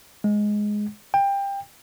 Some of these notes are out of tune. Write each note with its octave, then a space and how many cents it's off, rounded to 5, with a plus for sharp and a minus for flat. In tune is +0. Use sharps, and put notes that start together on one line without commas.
G#3 +5
G5 +20